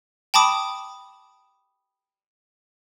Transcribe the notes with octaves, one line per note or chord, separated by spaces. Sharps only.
G5 A5 B5 D6 D#6